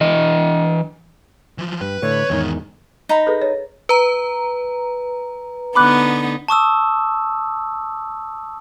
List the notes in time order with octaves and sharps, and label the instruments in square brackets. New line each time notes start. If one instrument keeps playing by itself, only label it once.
[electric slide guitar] E3 D#5
[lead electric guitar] E3 F3
[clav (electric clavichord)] G2 [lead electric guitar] B4
[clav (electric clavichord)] A2 D3 A3 [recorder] C#5
[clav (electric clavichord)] E2 G#2 D#3 [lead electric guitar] E3 D#5
[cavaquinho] D#4 A#5 B5
[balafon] G#4 A4 B4
C#5
[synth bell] B4 A#5
[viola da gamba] D3 B3 D#4 [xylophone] B5 D6 F#6
[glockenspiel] A5 C#6 D#6 E6